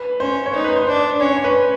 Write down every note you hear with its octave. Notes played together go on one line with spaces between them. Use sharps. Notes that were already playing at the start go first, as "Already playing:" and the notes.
Already playing: B4
C#4 C5
C#5
D#4 C5
B4
C5
D4 C5
C#4 C#5
C#5
B4
C5